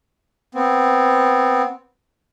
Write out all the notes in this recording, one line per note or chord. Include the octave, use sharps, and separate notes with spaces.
B3 C4